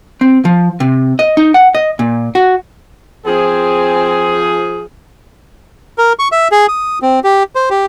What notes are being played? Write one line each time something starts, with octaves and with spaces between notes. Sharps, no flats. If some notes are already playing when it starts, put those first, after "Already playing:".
C4
F3
C3
D#5
D#4
F#5
D#5
A#2
F#4
F3 C4 G#4 G#5
A#4
C#6
E5
G#4
D#6
C4
G4
C5
G4